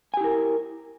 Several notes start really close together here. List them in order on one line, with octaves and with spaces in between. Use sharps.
G#5 G4 E4 A#4